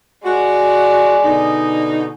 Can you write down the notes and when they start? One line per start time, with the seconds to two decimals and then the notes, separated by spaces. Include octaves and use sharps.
0.24 G#3 F#4 D5
1.24 B2 D3 D#4